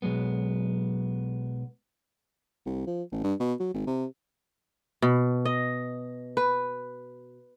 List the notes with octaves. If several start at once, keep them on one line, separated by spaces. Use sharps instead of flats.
B1 G2 F#3 G#3 B3
C2
F3
A1
G2
B2
F#3
G#1
C3
B2
D#5
B4